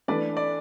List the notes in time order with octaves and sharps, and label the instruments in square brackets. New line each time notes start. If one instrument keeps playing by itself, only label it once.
[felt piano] E3 A3 D4 B4 [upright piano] D5
[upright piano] D5